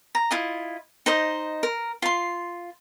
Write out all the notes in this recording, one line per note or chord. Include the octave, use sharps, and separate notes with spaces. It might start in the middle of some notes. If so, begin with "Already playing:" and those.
A#5
E4 F4 D#5
D#4 C5 D#5
A#4
F4 C6